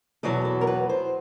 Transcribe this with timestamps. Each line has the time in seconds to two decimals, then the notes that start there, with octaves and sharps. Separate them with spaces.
0.23 E2 B2 F#3 A4
0.45 A4
0.61 A#4
0.67 B4
0.89 C5